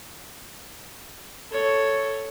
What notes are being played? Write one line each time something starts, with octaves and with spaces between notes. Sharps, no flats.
A4 C#5